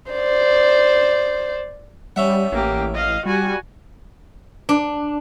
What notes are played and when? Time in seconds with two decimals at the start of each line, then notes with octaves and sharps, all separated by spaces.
0.12 C5 D5
2.16 G3 C#4 E5 F#5
2.52 A1 A#3 G4
2.94 D#5 F5
3.26 G3 F#4 G#5
4.69 D4